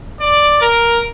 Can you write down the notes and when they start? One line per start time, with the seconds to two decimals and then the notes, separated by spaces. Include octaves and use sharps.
0.20 D5
0.61 A#4